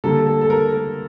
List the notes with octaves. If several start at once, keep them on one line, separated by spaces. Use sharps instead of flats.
D3 G3 A#3 A4
A4
A4
A#4
A#4